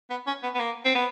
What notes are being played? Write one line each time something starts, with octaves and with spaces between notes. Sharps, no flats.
B3
C#4
B3
B3
A#3
C4
B3